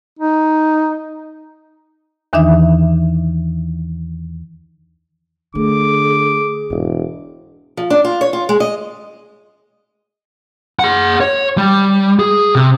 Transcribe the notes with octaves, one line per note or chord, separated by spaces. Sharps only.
D#4
E2 D#3 E3 D4 D#4 E5
D3 A3 G#4 D6
E1 G#2 E3
F3
D4
F4
C#5
F4
G#3
D#5
G#4 F#5
C#5
G3
G#4
C3